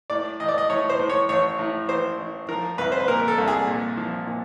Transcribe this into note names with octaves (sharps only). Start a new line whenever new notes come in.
A2 D5
A1 D#5
D5
D#5
A2 C#5
C5
A2
C#5
A1 C#5
A2
A1 C5
A1
F3 A#4
C2 B4
C5
B4
A#2 A#4
A#4
A4
C2
G#4
A#2
F3
A#2